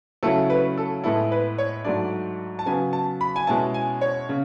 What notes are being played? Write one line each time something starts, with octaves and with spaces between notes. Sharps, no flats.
C#3 F#3 A3 C#4 E4 A4
B4
A4
A2 G#3 B3 E4 A4
B4
C#5
G#2 F#3 A3 D4 D5
A5
C#3 F#3 B3 G#5
A5
B5
G#5
B2 G#3 C#4 E4 A5
G#5
C#5
C#3